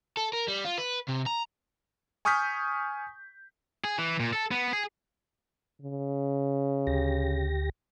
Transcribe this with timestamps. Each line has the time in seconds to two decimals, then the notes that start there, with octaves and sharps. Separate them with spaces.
0.17 A4
0.33 A#4
0.48 G3
0.65 F4
0.78 B4
1.08 C3
1.26 A#5
2.25 G#5 C#6 D#6 F6 G6 B6
3.84 G#4
3.98 E3
4.20 A#2
4.33 A4
4.51 B3
4.73 G#4
5.82 C#3
6.87 D2 G4 A#6